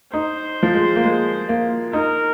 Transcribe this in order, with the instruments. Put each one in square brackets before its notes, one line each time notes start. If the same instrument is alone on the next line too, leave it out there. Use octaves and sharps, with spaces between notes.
[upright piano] D#4 [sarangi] C5
[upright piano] F3
G#3
A#3
G#3
A#3
[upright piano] D#4 [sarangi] A#4